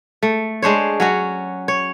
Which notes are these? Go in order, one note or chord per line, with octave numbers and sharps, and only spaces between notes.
A3
G#3 D4 C5 C#5
F#3 C#4 F#4
C#5